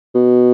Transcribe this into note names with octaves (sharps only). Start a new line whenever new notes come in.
B2